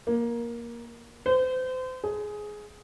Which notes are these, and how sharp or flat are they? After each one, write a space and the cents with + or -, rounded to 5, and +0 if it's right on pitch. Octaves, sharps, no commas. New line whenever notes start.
A#3 +15
C5 -35
G#4 +10